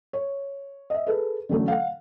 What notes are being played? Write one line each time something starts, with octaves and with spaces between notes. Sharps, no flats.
C#5
D#5 E5
G#4 A4 B4
D3 E3 F#3 A3 C#4
F5 F#5